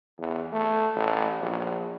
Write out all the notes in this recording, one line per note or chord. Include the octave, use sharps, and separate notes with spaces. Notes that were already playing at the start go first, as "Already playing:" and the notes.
E2
A3
A1
A#1